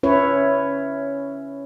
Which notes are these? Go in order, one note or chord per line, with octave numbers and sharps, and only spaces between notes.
C#4 E4 B4 C#5